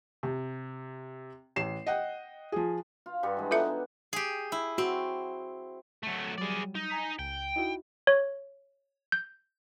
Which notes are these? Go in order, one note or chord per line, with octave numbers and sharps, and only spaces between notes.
C3
A1 C7 E7
D#5 F#5 G5
F3 G#4
F4
G2 G3 F#5
E3 G#3
B3 D4 D#4 F4 A4 E5
E4
G4 G#4
E4
C4 F#4
F#3 A3
F#3 G3 G#4 D5
D#4
G#5 A#5 B6
C#2 G5
D#4 E4 F#4
C#5
G6